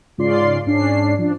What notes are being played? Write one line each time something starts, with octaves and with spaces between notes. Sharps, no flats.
G#2 C#3 F4 D5 C6 C7
G#2 C#4 D4 C7
F3 D4